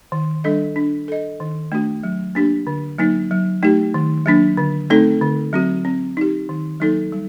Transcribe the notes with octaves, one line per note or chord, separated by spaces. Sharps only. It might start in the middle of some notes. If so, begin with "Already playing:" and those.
D#3
G3 D4 A4 D#5
D4
A4 D#5
D#3
A3 D4 F#4
F#3
A#3 D4 G4
D3
F#3 A#3 D#4
F#3
A3 D#4 G4
D#3
F#3 A#3 D4
D3
A3 C4 D#4 A4
D3
F#3 C4 F#4
C4
D#4 G4
D#3
F#3 A#3 D#4 A4
G3